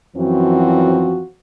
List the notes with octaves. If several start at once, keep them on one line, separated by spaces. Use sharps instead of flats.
F#2 E3 F3 C4 F#4